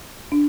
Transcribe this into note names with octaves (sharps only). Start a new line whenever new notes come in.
D4